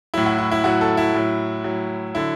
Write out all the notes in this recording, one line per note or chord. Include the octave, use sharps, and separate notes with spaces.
A2 F#3 E4
F#4
E4
E4
A2 F#3 F#4
A4
E4
A2 F#3
A2 F#3
D3 F#3 E4